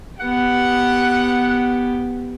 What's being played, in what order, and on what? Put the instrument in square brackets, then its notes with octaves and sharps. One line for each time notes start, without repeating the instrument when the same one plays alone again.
[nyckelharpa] B3 G4 [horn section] F#5